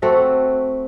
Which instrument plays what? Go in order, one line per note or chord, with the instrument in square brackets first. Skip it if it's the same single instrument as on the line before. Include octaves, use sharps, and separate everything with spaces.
[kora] A3 C4 F#4 A4